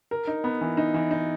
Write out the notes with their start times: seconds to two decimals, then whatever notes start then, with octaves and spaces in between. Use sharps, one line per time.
0.11 A#4
0.27 D#4
0.44 B3
0.61 E3
0.77 D#4
0.94 E3
1.11 D#4